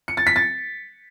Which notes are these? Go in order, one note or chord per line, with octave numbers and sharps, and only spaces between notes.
C#7
A6
B6
A6